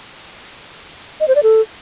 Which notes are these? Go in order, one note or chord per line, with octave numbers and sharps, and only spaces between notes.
D#5
C5
D5
A4